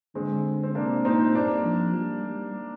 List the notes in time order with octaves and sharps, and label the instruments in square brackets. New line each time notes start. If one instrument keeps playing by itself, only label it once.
[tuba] D3 [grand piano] G#3 C4
[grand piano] C4
[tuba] C3 [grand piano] A#3 D4
[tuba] A#2 [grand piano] C4 D#4
[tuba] G2 [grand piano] A#3 D4
[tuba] F3
G3
G3